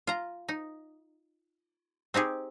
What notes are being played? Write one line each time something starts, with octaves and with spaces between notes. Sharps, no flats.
F4 A#5
D#4
C4 D#4 G4 G#4